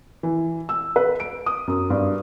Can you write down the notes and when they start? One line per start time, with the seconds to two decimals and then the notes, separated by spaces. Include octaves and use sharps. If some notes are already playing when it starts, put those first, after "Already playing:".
0.23 E3
0.69 E6
0.96 B4
1.20 D7
1.46 D#6
1.67 F#2
1.90 G2